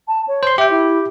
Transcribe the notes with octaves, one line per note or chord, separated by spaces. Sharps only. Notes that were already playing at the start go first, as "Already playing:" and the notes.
A5
C#5
C5 C6
G4 E5 G5
E4